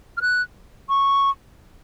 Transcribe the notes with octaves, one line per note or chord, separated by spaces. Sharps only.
F6
F#6
C#6